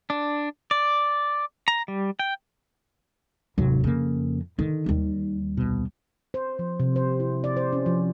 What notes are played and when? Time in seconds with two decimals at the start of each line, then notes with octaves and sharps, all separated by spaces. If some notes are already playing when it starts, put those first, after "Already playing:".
0.10 D4
0.71 D5
1.68 A#5
1.88 G3
2.19 G5
3.58 F1 D#2 G#2 F#3
3.84 F2 C#3 A#3
4.59 D3 D#3
4.86 D#2 G3
5.57 C2 B2
6.34 C5
6.59 F3
6.80 C3
6.96 C5
7.20 E4
7.44 D5
7.57 C5
7.73 C#4
7.86 F3